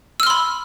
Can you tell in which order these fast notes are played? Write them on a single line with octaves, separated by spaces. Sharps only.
E6 F6 C6 B5